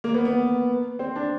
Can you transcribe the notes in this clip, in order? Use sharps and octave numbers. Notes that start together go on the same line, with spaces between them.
A#3
B3
B3
C4
D4